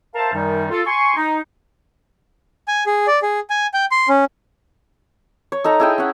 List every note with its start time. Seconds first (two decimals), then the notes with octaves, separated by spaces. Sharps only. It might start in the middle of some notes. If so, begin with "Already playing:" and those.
0.15 A#4 C5 E5 F5 A5
0.33 F#2 D#3 G3 D#4
0.71 F4 A4
0.86 G#5 C6 C#6
1.16 D#4
2.68 G#5
2.86 G#4
3.07 D5
3.23 G#4
3.50 G#5
3.74 G5
3.91 C6
4.09 C#4
5.52 C#5
5.64 D#4 A4 A#5
5.80 E4 G#4 G5
5.98 C#4 F#5